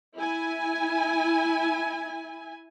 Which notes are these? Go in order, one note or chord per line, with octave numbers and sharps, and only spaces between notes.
E4 G#5